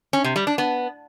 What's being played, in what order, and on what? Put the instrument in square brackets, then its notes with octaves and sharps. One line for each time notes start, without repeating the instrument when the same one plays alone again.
[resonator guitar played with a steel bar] C#4
C3
G3
D4
B3